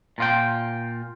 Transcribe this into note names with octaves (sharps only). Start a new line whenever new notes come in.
A#2 F4 G5